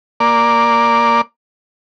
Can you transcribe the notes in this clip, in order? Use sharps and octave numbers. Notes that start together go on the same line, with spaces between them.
A#3 D5